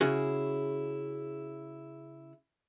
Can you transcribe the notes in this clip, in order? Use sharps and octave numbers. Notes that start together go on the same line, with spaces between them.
C#3 C#4 E4 F#4 G#4